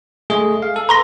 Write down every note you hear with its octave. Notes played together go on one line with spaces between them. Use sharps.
G#3 A3 G#4
F5
A4
B4 A#5 C6 A#6